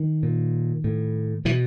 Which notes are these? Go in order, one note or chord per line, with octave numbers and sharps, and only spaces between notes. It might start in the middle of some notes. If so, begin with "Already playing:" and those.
Already playing: D#3
A#2
A2
B2 E3